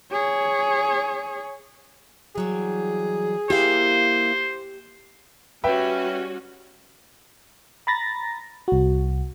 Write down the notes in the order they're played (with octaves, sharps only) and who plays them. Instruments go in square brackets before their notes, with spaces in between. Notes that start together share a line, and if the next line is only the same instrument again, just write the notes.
[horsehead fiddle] G#4 C#5
[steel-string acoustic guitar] E3 F#3 G3 [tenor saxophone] G#4
[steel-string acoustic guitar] A#3 E4 F5 [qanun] G4 [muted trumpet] C5
[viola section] G3 C#4 F#4 [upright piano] B4 E5 G5
[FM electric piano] A#5 B5 A6 A#6
C2 F#4